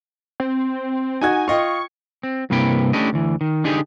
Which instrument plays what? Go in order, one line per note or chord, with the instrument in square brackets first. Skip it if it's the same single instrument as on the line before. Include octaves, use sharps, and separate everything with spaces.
[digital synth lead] C4
[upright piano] D#4 F#4 G#6 [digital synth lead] G#5
[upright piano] F4 D#5 G5 [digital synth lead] C#6
[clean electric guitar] C4
G2 C3 A#3 E4 B4 G5
A3 C#4 D4 E4 G4 D#5
D2 E3
D#3
D3 D4 D#4 G4 G#4